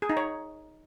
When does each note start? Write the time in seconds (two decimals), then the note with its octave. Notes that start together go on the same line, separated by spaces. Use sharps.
0.02 G#4
0.09 D#4
0.17 C#5